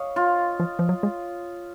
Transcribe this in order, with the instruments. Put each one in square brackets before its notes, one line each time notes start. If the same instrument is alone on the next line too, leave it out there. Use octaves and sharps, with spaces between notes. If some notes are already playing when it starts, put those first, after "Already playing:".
Already playing: [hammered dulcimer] C#5 D#5 F5
F4
[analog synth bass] F3
F3
F#3
G#3